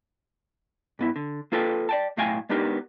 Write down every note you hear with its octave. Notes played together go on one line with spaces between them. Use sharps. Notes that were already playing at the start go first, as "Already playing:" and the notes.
G#2 B3 E4
D3
A#3 F4 A4 B4 F5 G5
D5 G5 A5
B1 A2 A3 F5 G5 G#5
G#3 B3 D4 D#4 G4 A#4